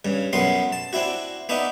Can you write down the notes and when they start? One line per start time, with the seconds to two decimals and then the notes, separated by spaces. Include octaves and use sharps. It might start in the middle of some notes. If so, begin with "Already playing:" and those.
0.05 G2 C#3
0.33 B1 F#2 F#3 B3 B5 C6
0.72 A5
0.93 C4 D4 E4 F#4
1.49 B3 D4 D#4 E5